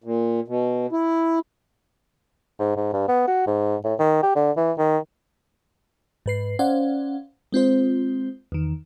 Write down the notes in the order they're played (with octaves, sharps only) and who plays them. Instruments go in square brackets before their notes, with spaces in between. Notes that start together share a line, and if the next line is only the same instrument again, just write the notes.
[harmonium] A#2
B2
E4
[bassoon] G#2
G#2
G2
B3
F#4
G#2
A2
D#3
G4
D3
E3
D#3
[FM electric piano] G#2 B4 C7
C#4 C5 D5 F5 F#5
G#3 C4 F4 C5
E2 D#3